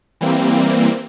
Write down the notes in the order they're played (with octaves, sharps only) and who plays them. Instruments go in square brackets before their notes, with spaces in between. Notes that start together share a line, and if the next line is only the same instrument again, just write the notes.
[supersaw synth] E3 G3 A#3 C4